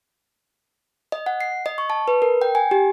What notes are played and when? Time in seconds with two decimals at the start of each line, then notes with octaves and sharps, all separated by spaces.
1.12 D#5
1.26 F#5
1.41 C7
1.66 D#5
1.78 C#6
1.90 A5
2.08 B4
2.22 A#4
2.41 G5
2.55 G#5
2.71 G4